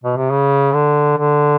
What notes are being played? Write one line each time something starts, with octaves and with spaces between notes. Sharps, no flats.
B2
C3
C#3
D3
D3